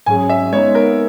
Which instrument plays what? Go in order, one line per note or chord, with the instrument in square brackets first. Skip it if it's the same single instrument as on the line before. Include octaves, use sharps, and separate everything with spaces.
[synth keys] G#2 F#3 C#4 G#4 [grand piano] G#5
[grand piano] E5
[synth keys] G#3 B3 D#4 [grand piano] C#5
[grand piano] A#4